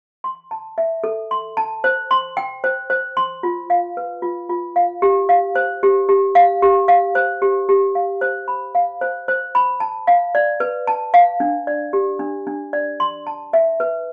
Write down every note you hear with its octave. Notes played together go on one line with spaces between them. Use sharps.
C6
A5
E5
A4
C6
A5
C5
C6
G5
C5
C5
C6
F4
F5
B4
F4
F4
F5
G4
F5
C5
G4
G4
F5
G4
F5
C5
G4
G4
F5
C5
B5
F5
C5
C5
B5
A5
F5
D5
B4
A5
F5
D4
D5
G4
D4
D4
D5
C6
A5
E5
B4